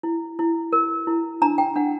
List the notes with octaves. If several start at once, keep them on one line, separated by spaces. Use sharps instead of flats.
E4
E4
A#4
E4
D4 A#5
G5
D4 F#5